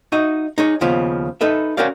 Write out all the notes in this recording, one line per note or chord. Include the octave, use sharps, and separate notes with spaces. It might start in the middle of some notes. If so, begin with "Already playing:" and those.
D#4 F#4 D#5 E5
D#4 G#4 C#5
D#2 C#3 F3 B3 F4
D#4 A4 B4 E5
C#4 F#4 A#4 C5 D5 F5